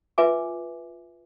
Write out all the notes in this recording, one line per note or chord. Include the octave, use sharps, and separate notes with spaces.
F4 B4 E5 G#5 D6